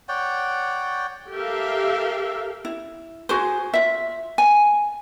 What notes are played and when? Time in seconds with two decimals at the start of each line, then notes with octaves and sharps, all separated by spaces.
0.09 C#5 D5 F#5 G5
1.32 G4 A4 A#4 E5 F5
2.65 E4
3.29 F#4 G#4 C5
3.74 F4 E5
4.38 G#5